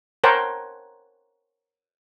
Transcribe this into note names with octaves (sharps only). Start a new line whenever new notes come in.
A#4 C5 C#5 F#5 G5 A5